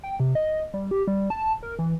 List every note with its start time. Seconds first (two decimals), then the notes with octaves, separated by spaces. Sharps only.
0.04 G5
0.20 C3
0.35 D#5
0.74 G3
0.91 G4
1.07 G3
1.30 A5
1.63 A#4
1.79 E3